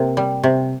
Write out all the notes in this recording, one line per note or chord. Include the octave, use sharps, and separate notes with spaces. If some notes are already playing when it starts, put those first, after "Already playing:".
Already playing: C3 A#3
G3
C3